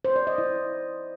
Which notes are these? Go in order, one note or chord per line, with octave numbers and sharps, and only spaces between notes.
C5
D5
D#5
E4